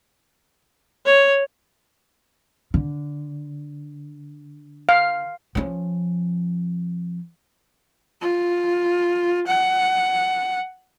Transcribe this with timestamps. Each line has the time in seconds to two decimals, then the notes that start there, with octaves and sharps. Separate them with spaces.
1.06 C#5
2.74 D3
4.89 F5
5.55 F3 C#4
8.21 F4
9.47 F#5